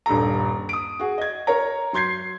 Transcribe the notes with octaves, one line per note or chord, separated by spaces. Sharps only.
D#1 G2 A4 A#5
D#6 D7
F#4 G#4
D#5 G#6
A#4 C#5 A#5
F#3 C6 G6 G#6 C7